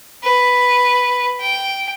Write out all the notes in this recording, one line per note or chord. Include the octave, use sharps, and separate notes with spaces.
B4
G5